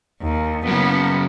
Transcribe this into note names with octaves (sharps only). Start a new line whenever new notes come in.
D#2
F#2 C#3 B3